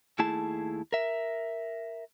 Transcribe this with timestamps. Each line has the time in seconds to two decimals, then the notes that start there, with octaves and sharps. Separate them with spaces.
0.19 D#2 A3 E4 G#4 A5
0.93 A#4 E5